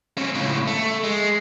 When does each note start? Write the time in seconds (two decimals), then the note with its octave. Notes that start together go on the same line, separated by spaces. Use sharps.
0.17 C4 C#4
0.35 C#2 A2
0.67 A3
1.04 G#3